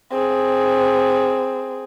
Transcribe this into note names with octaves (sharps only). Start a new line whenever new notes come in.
C4 G#4